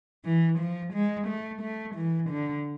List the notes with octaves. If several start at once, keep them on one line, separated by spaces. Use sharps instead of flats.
E3
F3
G#3
A3
A3
E3
D3